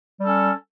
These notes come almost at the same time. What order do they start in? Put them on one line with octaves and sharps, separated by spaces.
G3 A4 C#4